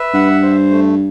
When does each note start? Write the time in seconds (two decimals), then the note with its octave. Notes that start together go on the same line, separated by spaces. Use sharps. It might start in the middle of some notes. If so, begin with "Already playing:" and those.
Already playing: B4 E5
0.14 G2 F#5
0.42 C5
0.71 A3